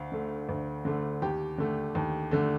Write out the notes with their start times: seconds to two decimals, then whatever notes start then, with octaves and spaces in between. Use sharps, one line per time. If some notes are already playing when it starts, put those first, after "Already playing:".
Already playing: D2 F5
0.12 D3 A3
0.49 D2
0.85 D3 A3
1.22 D#2 G4
1.58 D3 A3
1.95 D#2
2.31 D3 A3